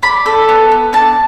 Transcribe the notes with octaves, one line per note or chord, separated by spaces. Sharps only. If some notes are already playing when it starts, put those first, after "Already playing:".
D4 B5
A4
B3
B3
D4 A5